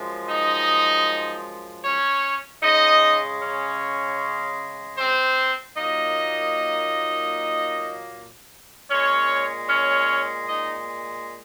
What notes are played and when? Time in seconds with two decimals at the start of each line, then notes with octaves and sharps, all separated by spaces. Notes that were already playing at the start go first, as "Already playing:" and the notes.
Already playing: F#2 F3 G#3
0.27 D#4 D#5
1.84 C#4 C#5
2.63 C#3 G#3 D#4 D#5
3.42 C#4 C#5
4.98 C4 C5
5.77 A#2 F#3 A#3 D#4 D#5
8.90 A#2 G#3 C#4 C#5
9.68 C#4 C#5
10.47 D#4 D#5